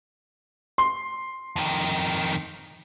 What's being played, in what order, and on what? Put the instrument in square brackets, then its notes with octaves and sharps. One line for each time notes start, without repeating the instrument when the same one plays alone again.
[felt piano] C6
[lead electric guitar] F2 D#3